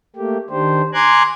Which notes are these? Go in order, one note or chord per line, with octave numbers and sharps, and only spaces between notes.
A3 A#3 G4
D#3 D4 G4 C5
G#5 A#5 C6 D6 F#6 G#6